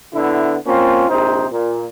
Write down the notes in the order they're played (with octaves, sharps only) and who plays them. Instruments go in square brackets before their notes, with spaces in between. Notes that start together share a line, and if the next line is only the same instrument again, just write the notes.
[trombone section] D3 B3 E4
A#3 C4 C#4 F4
A#1 C3 D#4 C5
A#2